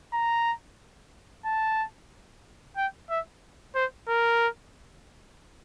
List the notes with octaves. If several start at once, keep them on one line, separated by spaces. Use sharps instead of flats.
A#5
A5
G5
E5
C5
A#4